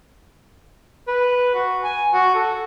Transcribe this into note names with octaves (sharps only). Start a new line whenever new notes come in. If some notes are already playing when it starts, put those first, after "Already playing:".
B4
F#4
G#5
F#4
A4